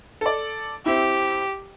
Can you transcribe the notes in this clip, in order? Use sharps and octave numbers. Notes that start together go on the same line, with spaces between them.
A4 D5
C4 E4 G4